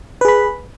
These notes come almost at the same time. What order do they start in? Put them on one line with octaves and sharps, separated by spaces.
B4 G#4 B5